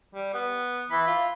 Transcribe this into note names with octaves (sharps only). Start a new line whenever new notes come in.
G3
B3
E3 B5
F4